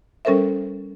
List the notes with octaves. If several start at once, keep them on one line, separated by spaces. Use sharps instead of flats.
G3 C#4 A4 A#4 C5 E5